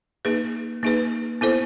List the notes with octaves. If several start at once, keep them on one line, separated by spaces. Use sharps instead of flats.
A#3 D#4 G#4 B4
A#3 D#4 G#4 B4
B3 E4 A4 C5